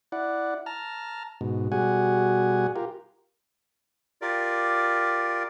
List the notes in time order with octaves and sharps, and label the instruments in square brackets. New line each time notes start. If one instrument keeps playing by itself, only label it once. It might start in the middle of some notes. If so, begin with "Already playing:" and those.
[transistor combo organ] E4 D5 F#5
A5 A#5 F6
G#2 B2
B2 G3 F#4 G#4 F#5 G#5
F4 G4 A#4
[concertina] F4 G4 A#4 D5